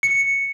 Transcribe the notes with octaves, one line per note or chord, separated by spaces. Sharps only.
C#7